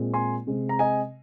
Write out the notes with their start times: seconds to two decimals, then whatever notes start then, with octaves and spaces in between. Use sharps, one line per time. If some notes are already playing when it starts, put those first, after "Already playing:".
Already playing: A#2 G#3 C4
0.14 G#5 C6
0.47 C3 G#3 C4
0.69 A#5
0.79 D#5 G#5